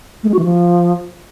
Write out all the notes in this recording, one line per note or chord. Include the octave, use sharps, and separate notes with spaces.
A3
G#3
F#4
E3
F3